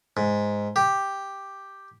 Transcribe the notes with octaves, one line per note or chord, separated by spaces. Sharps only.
G#2
G4